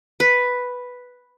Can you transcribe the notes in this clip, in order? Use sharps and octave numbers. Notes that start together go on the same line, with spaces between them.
B4